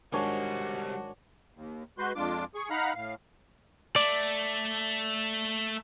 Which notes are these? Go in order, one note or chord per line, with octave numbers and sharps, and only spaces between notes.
G#2 D#3 G3 D4 F#4 C5 C#5 G#5
D#2
G#3 F#4 B4 C6 G6
F2 G#3 D4 F4 D6
G#4 C#6
D#4 F5 F#5 A#5 B5 F6
A2 F5
A3 D5